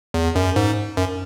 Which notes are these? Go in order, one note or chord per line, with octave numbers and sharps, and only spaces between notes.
E2
F#2
G#2
F#2